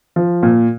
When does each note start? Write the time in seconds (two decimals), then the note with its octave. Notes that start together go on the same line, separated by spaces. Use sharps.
0.16 F3
0.43 A#2